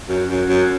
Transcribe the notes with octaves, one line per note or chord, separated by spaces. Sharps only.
F#2
F#2
F#2